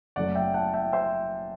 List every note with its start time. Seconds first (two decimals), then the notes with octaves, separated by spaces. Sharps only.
0.16 F#1 F#2 F#3 A3 D5 F#5
0.35 E5 G5
0.54 F#5 A5
0.74 E5 G5
0.92 C5 E5